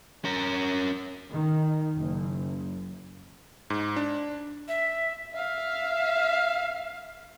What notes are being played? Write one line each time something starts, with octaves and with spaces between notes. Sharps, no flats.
C#4 A#4
D#3
F#1
G#2
D4
E5
E5 F5